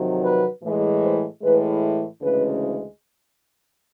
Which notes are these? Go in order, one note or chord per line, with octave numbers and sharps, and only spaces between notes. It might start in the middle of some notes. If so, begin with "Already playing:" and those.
Already playing: F2 C3 D#3 F#3
B4
A2 E3 G#3
C5
A2 E3 G#3 B4
D2 C#3 E3 G#3 B4